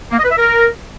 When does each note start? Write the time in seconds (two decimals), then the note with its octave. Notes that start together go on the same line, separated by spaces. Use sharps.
0.12 A#3
0.18 D#5
0.24 B4
0.31 E5
0.37 A#4